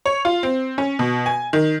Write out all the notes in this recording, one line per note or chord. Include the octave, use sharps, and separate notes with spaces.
C#5
F4
C4
C#4
B2
G#5
D#3